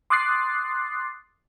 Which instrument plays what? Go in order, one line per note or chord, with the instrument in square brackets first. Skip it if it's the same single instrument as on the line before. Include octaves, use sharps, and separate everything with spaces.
[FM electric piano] C6 D6 D#6 F#6 A6 C7